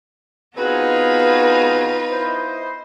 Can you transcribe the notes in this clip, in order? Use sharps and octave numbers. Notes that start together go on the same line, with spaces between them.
B3 C4 D#4 F4 F#4 G#4 B4
E4 C5 D#5